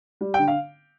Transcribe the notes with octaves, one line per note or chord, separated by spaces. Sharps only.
G3
G5
D3
F5